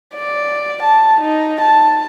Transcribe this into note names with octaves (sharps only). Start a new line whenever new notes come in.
D5
A5
D#4
A5